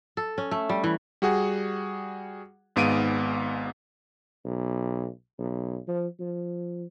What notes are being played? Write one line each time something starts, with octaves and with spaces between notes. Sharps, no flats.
A4
C#4
A3
G3
E3
G3 F#4 G#4 F#5
G#1 G#2 B3 F5 D7 D#7
B1
B1
F3
F3